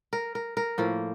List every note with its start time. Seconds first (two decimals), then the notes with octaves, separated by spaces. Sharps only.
0.13 A#4
0.35 A#4
0.57 A#4
0.78 A2 F3 A#3